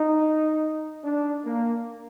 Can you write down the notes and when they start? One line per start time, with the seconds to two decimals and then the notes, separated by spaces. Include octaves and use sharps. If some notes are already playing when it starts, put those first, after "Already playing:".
Already playing: D#4
1.03 D4
1.45 A#3